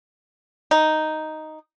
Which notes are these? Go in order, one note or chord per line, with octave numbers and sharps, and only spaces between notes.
D#4